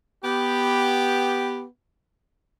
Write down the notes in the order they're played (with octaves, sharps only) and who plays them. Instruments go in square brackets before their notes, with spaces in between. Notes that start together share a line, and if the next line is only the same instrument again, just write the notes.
[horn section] B3 G4